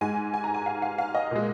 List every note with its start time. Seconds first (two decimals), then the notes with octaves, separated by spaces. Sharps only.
0.01 G#2 G#3 G#5
0.34 G#5
0.44 A#5
0.54 G#5
0.66 F5
0.82 F5
0.98 F5
1.15 D#5
1.31 A#2 G#3